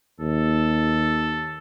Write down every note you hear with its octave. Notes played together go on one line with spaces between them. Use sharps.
D#2 A4